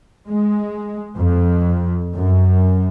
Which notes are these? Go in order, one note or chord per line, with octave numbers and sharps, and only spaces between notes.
G#3
F2
F#2